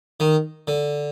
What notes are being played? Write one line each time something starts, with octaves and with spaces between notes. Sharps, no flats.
D#3
D3